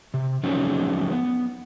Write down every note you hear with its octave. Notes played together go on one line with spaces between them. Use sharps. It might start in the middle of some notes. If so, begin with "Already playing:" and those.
C3
F3 F#3 G#3 C4 C#4 D#4
B3